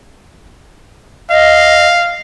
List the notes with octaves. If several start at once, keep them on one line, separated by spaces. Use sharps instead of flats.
D#5 F5